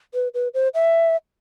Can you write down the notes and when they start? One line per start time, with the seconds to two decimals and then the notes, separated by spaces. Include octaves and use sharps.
0.14 B4
0.34 B4
0.54 C5
0.74 E5